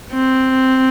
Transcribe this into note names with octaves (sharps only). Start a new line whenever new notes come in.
C4